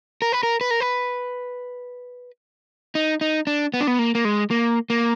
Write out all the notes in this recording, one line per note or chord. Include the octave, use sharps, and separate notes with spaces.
A#4
B4
A#4
B4
A#4
B4
D#4
D#4
D4
B3
D4
B3
A#3
A#3
G#3
A#3
A#3